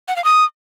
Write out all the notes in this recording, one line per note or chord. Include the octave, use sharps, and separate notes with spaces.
F#5
F5
D#6